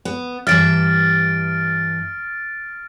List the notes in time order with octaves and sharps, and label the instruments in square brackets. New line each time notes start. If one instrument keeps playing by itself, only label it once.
[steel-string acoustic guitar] B3
[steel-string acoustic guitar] G2 E3 E5 [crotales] F6 A6 D7